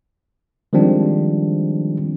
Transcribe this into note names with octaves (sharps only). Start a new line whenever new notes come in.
D#3 F3 G3 G#3 C4 D4